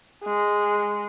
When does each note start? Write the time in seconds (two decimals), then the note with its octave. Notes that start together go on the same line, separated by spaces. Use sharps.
0.24 G#3